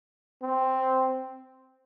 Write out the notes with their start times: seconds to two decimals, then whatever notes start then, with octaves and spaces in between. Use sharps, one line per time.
0.42 C4